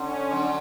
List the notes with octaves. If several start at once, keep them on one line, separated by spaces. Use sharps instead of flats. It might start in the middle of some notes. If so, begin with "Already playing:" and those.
Already playing: D3 C#4
D3 F#3